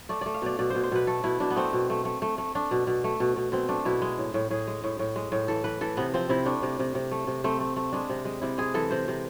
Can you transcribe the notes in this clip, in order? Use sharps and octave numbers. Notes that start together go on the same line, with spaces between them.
A3 D5
A3 D5
F5
B2 D5
B2 D5
B2 C5
C5
B2 B4
A3 A4
B2 E4
B2 D4
B3
A3 C4
B2
A3
A3
A3
A3
A3 D4
B2
B2
A3
B2
B2
B2 C4
A3 D4
B2 E4
G#3
A2
A2
A2 G#4
G#3
A2
A2
G#3
A2
E3 A4
E3 B4
E3 A4
C3 B3
F3 C4
C3 E4
A3 D4
C3
C3
C3
A3
C3
A3 C4
A3
A3
G#3 D4
C3
G#3
C3 E4
G#3 G#4
E3 A4
C3 C5
C3